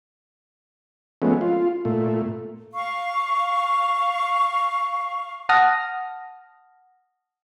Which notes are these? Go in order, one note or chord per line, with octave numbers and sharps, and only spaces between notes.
F3 G#3 A3 B3 C#4
F4
A#2 A3
F5 C#6
F#5 A5 D#6 F6 A#6